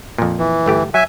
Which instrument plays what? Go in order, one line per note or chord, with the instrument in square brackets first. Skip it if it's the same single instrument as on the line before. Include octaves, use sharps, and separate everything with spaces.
[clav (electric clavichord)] F2 A#2
[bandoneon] E3
[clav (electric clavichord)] G1 A3 G4
[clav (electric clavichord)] F#3 [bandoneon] E5 G#5